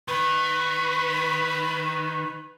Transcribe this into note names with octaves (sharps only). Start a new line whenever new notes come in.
D#3 B4